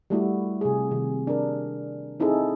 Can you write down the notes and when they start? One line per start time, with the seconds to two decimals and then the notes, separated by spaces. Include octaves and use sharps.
0.10 G3 A3 E4 F#4
0.61 C3 G#4
0.91 C3 D#3
1.27 D4 A#4
2.20 C4 D#4 E4 G#4 A4